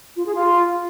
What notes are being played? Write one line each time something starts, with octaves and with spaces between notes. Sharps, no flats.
F4
G#4
F4